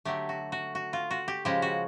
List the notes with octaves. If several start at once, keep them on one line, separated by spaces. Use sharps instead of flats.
D3 F#3 A3 G4
F#4
F#4
F#4
F4
F#4
G4
C#3 F3 G#3 G4
F#4